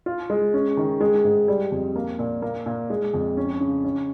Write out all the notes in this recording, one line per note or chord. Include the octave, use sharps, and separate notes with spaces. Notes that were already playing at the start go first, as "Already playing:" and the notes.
F4
G#3
C#4
D#3
G#3
G#2
G3
F2
A#3
A#2
A#3
A#2
G#3
F2
C#4
C#3
C#4